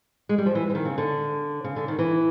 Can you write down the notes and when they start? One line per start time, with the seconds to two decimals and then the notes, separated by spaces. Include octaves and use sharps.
0.29 G#3
0.38 G3
0.46 F3
0.55 E3
0.70 E3
0.75 D#3
0.85 C#3
0.98 D3
1.64 C#3
1.76 D3
1.88 D#3
1.99 E3